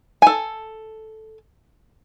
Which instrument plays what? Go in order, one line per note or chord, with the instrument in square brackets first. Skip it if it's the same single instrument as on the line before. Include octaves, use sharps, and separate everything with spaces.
[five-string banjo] A4 G#5